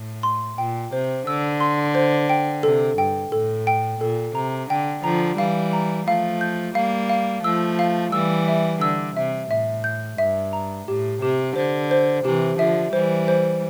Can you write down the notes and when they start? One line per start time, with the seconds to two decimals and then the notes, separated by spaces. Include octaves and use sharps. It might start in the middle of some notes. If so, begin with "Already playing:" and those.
Already playing: A2
0.23 C6
0.58 A#2 G5
0.93 C3 C5
1.27 D3 E6
1.60 C6
1.95 C5
2.29 G5
2.63 C3 A4
2.98 G2 G5
3.32 A2 A4
3.67 G5
4.01 A#2 A4
4.35 C3 A#5
4.70 D3 G5
5.04 D3 F3 A#5
5.38 E3 G3 F5
5.73 A#5
6.07 F3 A3 F5
6.41 G6
6.75 G3 A#3 F5
7.09 F5
7.44 F3 A3 E6
7.79 F5
8.12 E3 G3 E6
8.48 E5
8.81 D3 E6
9.17 C3 E5
9.50 A2 E5
9.84 G6
10.18 G2 E5
10.53 A#5
10.88 A2 G4
11.22 C3 G4
11.56 D3 C5
11.91 C5
12.25 C3 E3 G4
12.59 D3 F3 E5
12.93 E3 G3 C5
13.28 C5